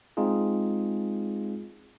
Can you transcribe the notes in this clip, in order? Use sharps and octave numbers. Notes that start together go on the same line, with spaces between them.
G#3 C4 D#4 F4 G#4